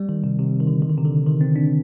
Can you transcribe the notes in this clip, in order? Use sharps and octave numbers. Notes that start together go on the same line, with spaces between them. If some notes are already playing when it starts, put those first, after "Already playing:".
Already playing: G3
D#3
C3
C3
D#3
D3
D#3
D3
C3
D3
D#3
C4
D4